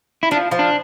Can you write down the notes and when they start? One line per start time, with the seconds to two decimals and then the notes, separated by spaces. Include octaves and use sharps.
0.23 E4
0.31 F3 D4
0.51 F3
0.59 D4